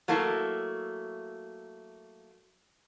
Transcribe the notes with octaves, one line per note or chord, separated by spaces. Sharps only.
F#3 A3 A#3 E4